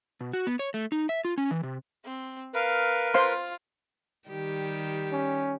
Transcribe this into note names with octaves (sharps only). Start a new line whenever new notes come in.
B2
F#4
B3
C#5
A3
D#4
E5
F4
C#4
E3
C3
C4
A#4 B4 F5
F4 C5 F5 C6
D#3 G3 G4
C#4